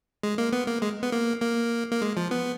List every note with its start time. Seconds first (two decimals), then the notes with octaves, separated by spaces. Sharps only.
0.23 G#3
0.38 A#3
0.53 B3
0.67 A#3
0.82 G#3
1.03 B3
1.12 A#3
1.42 A#3
1.91 A#3
2.02 G#3
2.17 F3
2.31 B3